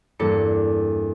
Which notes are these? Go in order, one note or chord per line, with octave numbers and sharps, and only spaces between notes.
E2 G2 A#3 D4 A4 C#7